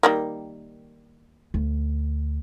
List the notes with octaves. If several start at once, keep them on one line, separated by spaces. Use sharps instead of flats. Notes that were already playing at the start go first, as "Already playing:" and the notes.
D#3 G3 A#3
D2